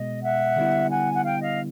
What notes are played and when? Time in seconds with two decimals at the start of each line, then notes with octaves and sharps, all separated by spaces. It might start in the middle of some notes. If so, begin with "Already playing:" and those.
Already playing: B2 G#3 B3 D#5
0.23 E5 F#5
0.56 D3 G3 B3 E4
0.90 F#5 G#5
1.13 F#5
1.24 F5 G5
1.41 D#5 F5